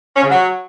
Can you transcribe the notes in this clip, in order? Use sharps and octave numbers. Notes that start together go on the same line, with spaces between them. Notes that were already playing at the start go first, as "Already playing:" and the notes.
C#4
C#3
F#3